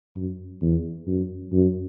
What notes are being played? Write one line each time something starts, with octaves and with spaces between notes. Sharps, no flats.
F#2
E2
F#2
F#2